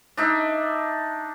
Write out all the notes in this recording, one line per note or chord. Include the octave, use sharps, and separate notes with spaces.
D4 D#4 E5